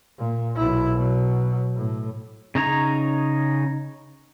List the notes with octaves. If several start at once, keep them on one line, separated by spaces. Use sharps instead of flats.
A#2
B1 E4
B2 F#3
A2
C#3 D#4 C#5 A#5